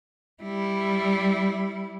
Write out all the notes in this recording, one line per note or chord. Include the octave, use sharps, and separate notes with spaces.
G3 E4